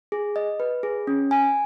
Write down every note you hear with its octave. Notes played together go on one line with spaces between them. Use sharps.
G#4
D#5
B4
G#4
C#4
G#5